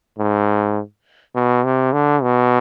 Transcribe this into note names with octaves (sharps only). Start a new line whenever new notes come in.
G#2
B2
C3
D3
B2